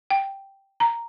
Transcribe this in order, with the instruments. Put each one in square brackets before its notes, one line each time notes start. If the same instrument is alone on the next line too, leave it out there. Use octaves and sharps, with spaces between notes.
[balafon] G5
A#5